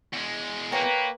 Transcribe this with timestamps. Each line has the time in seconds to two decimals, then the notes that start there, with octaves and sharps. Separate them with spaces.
0.13 E2 G#3
0.72 A#3 B4 C#5 G5 A#5